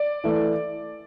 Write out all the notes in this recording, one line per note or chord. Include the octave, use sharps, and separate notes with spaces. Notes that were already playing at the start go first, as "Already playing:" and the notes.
Already playing: D5
E3 A3